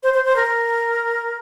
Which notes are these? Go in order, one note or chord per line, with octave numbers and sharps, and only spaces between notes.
C5
C5
C5
A#4